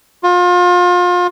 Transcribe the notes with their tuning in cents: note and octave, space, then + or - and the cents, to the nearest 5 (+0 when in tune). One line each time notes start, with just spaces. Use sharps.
F4 +30